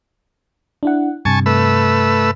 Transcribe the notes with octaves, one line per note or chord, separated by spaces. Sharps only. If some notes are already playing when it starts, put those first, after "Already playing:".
D4 E4 F#5
G2 C3 G#5 A5 C#6
A3 B4 E6